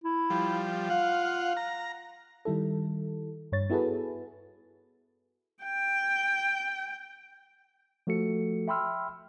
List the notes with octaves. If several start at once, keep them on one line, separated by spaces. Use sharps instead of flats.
E4
F3 G3
F4 F5 F#5
A#5
D#3 G3 E4 A4
G2 C#5 A6
B3 E4 F#4 G#4 A4 B4
G5
F3 A3 F#4 A4 C#7
E5 G5 B5 C6 E6 F6